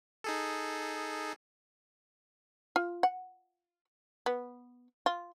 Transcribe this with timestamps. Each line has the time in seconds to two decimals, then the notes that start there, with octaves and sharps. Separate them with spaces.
0.24 D#4 G#4 A4
2.76 F4
3.03 F#5
4.26 B3
5.06 F4